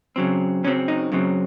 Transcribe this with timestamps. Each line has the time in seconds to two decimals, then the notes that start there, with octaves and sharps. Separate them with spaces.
0.16 F#2 C#3 F#3 C4
0.64 F#2 C#3 F#3 C4 C#4
0.88 D#4
1.12 F#2 C#3 F#3 C4